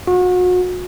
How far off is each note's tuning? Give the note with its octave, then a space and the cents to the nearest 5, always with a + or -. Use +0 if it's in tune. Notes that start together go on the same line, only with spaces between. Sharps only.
F#4 -35